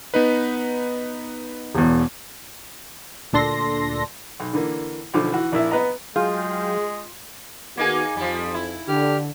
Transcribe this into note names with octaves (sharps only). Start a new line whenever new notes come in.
B3 D#4 B4
E1 E2
D2 A#2 D4 A4 C6 A#6
B1
D3 E3 A#3
B1 D3 F3 D6
E3 F#4
A#1 A#3 E4 E5
B3 B4 D#5 A#5
F#3 G#3 F4 G#4 F5 G5
D#3 A#3 B3 D#4 F#4 G#4
F2 F3 G3
E4
D3 G4 F6